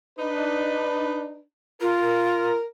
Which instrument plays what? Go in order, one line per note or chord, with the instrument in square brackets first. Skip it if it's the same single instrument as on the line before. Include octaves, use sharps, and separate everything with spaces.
[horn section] D4 D#4 B4
[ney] F4 [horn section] A#4